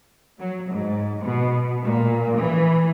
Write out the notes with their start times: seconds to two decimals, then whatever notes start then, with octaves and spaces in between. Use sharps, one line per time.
0.39 F#3
0.72 G#2
1.24 B2
1.83 A#2
2.37 E3